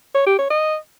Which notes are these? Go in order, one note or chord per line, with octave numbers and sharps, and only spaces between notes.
C#5
G4
C#5
D#5